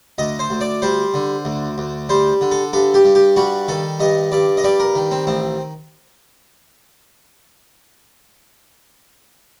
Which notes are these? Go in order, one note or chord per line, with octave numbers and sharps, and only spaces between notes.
D2 D#5
C5
D2
D5
G3 C5
D3
D2
D2
G3 C5
D3
A4
G2 A4
G4
G2
G4
G3 F#4
D#3 A4
G2 D#5
G2 D5
D#5
G3 D5
A#4
D#3
C4
A1 C4